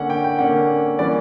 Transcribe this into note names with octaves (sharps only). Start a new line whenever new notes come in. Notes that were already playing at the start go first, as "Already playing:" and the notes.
Already playing: D3 A#3 C#4 F#5
G5
G5
D3 A#3 C#4 F#5
E3 G3 A#3 C#4 D5